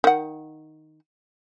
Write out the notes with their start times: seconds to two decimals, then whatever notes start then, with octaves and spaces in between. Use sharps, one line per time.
0.04 D#3 F#5